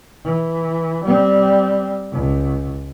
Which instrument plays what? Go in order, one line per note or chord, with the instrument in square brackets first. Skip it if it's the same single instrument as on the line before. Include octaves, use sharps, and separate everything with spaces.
[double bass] E3
G3 C4
C#2